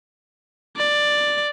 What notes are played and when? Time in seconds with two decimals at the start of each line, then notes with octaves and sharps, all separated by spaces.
0.77 D5